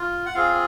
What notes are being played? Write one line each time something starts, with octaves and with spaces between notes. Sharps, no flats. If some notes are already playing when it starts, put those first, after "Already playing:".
Already playing: F4
F#5
C4 F4 G#4 F5